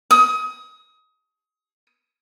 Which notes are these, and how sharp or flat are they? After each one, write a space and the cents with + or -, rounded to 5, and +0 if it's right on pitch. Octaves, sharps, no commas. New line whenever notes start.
D#6 +25